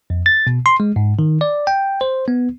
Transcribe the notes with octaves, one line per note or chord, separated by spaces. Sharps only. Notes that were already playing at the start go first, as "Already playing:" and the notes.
F2
A6
B2
C6
G#3
G#2
D#3
D5
G5
C5
B3